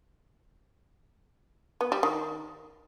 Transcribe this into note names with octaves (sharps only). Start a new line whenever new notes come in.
B3
G3
D#3